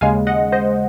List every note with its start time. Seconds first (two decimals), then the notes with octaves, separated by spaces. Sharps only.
0.01 D#2 C#3 G#3 F5 G#5
0.27 D#5 F#5
0.52 C5 D#5